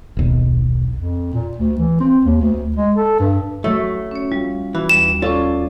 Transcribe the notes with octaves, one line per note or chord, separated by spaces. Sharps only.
D#1 B1
F2
A#2
D2
E3
C4
D#2
D2
G#3
A4
G2
F#3 A3 C#5 E5
C#4 C#5
G3 F4
E3 F#4
D#2 G3 E7
C#4 F4 A4 C#5 D5 E6